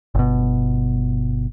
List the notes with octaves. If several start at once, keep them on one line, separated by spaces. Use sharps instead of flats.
G1 B2